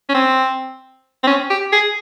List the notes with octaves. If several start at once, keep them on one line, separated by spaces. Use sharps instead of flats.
C#4
C4
C4
C#4
G4
G#4